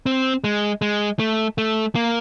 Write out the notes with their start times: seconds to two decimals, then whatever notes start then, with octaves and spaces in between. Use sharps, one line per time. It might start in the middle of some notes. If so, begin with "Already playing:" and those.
0.06 C4
0.44 G#3
0.82 G#3
1.19 A3
1.58 A3
1.95 A#3